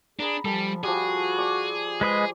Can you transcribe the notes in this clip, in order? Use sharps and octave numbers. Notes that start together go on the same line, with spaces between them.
D4 G#4 A#5 B5
F3 G3 A4 G#5
F3 G3 F#4 G#4
D5 C#6
G#3 B4 C5 D#5